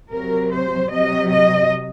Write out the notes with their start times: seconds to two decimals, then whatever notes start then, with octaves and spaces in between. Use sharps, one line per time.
0.11 C3 F#3 A#4
0.52 C5
0.92 C3 F#3 D#5
1.31 D#5